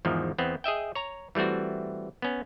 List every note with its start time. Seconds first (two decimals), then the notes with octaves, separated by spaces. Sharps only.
0.05 E2 G#2 D#3 F3
0.38 E2 B3 C4
0.64 G#4 D#5 E5 G5
0.95 C#5 A#5
1.35 E3 G3 A3 C4 F#4
2.22 B3 C#4